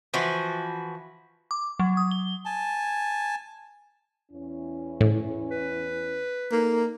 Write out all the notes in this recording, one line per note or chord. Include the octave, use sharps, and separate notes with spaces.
E3 F3 F#4
D6
F#3
D#6
G7
G#5 A5
E2 C#4 E4
A2
B4
A#3 D#4 A4